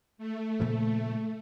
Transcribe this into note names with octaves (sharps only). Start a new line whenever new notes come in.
A3
A#2 C#3 F3